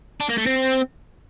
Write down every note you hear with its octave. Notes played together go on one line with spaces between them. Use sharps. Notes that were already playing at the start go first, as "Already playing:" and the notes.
D4
A#3
A3
C4